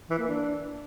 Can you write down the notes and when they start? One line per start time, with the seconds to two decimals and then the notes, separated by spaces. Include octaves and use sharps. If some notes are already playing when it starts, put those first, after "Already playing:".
0.10 E3
0.19 A#3
0.28 D4